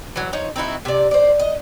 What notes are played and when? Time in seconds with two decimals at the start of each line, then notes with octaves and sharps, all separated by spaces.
0.16 E3 F#3
0.33 F3 D#4 C#5
0.56 C4 D#4 E4 F#4
0.85 C3 D5
1.11 C5 D5
1.40 D#5